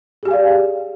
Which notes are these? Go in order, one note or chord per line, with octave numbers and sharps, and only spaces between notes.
G4 G#4 D5 F5 G#5